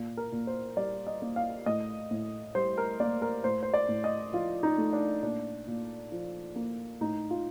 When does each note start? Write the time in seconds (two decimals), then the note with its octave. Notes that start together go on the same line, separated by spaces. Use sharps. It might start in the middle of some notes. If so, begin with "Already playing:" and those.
Already playing: A#2
0.17 A#4
0.32 A#2
0.47 C5
0.77 G3 D5
1.07 D#5
1.22 A#3
1.36 F5
1.66 A2 D#5
2.11 A2
2.55 G3 C5
2.78 A#4
3.00 A#3 D5
3.22 A#4
3.44 A2 C5
3.63 C5
3.74 D5
3.89 A2
4.04 D#5
4.33 F3 F4
4.63 D#4
4.78 A3
4.93 D4
5.22 A#2 D4
5.67 A#2
6.12 F3
6.56 A#3
7.01 A2 D#4
7.30 F4